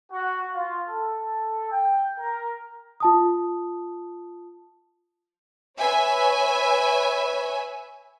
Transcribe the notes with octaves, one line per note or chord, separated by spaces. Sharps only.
F#4
F4
A4
G5
A#4
F4 A5 D#6
B4 C#5 E5 G#5